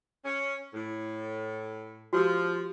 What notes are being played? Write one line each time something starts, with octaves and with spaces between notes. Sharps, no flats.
C#4
A2
F3 F#4 G4 E6